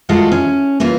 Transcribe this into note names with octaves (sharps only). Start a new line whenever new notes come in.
G#3 F4 F#4 A4 A#4
C#4
E3 A#3 F4 B4